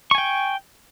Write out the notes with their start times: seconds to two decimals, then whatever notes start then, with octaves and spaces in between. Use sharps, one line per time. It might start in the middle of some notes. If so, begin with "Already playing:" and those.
0.11 C#6
0.15 G#5
0.18 G5